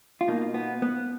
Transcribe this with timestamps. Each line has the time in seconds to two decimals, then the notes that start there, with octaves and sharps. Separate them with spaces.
0.21 F4
0.28 B2 A#3 D#4
0.54 B3
0.82 B3